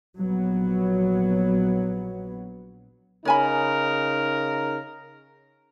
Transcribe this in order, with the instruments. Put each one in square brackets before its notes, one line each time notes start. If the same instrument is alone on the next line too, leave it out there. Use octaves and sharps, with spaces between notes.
[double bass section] A#1 F#3 B3
[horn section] C#3 D#4 A#4 [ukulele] C#5 G#5 B5